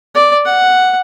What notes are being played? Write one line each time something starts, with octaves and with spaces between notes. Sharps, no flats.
D5
F#5